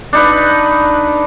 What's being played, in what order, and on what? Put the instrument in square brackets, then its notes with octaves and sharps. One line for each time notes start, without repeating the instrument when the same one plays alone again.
[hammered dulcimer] D4 D#4 B4